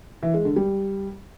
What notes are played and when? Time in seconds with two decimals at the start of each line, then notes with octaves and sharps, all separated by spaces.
0.23 E3
0.34 G#3
0.45 D3
0.56 G3